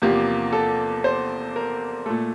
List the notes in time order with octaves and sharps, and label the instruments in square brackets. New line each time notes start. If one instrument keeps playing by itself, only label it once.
[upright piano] E2 C3 F3 A#3 G4
A4
C5
A#4
A#2 A3 A4